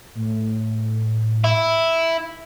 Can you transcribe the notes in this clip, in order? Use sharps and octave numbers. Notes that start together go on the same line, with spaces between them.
A2
E4